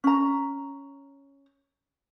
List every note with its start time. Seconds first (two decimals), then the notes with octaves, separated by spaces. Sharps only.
0.04 C#4 A#5